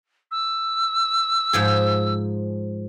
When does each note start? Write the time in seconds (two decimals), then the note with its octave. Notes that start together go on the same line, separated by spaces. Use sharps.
0.31 E6
1.53 G#2 F3 G#4